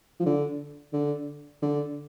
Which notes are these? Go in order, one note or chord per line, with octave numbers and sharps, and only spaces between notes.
F3
D3
D3
D3